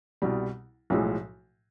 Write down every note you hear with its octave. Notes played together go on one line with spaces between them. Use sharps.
C2 B2 G3
B1 A2 F3 G#3